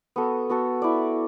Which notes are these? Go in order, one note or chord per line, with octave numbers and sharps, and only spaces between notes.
B3 F#4 A4
B3 F#4 A4
E4 D5